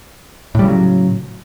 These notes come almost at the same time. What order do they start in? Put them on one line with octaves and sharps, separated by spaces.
A2 G3 C#3 F#3